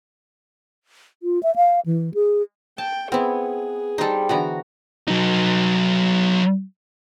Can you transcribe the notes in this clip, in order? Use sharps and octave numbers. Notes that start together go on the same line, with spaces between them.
F4
E5
F5
E3
G#4
G5 A5
B3 C4 E4 G#4
G3 D#4 A4 C5
D3 E3 B3 F#4 A#5
F#3 D#4